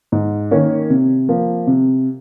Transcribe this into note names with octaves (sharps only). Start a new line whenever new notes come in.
G#2
D#3 A#3 C#4
C3
F3 A#3
C3